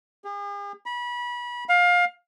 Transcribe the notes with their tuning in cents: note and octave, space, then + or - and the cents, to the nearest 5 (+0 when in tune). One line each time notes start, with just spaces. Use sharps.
G#4 -45
B5 -30
F5 +25